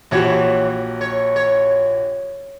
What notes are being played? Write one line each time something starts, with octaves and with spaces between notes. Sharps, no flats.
A#1 E3 F#4 G4 C#5
C#5
C#5